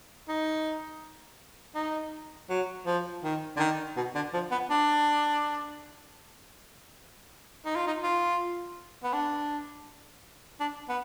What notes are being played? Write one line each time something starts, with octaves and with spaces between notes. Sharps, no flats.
D#4
D#4
F#3
F3
D#3
D3
D#3
B2
D3
F3
B3
D4
D#4
F4
D#4
F4
B3
D4
D4
B3